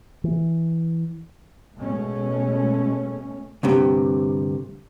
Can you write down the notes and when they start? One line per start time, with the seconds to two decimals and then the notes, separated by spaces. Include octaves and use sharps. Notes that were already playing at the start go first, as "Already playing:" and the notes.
0.24 E3
1.76 B2 G#3 A3 C#4
3.63 D2 G2 C3